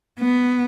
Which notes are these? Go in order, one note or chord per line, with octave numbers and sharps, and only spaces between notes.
B3